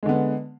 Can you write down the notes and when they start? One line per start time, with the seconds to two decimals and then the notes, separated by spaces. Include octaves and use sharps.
0.03 G#3
0.06 D3
0.09 B3